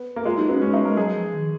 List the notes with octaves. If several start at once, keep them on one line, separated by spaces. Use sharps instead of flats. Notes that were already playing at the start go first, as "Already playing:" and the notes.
Already playing: B3
A#3
G#3 F4
F#3 D#4
B3 C#4
G#3 C#4
D#4
G#3 A#4
F#3 G#4
F3
D#3